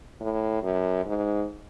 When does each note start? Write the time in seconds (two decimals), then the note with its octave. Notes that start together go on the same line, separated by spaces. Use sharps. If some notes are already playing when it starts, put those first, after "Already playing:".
0.21 A2
0.63 F#2
1.06 G#2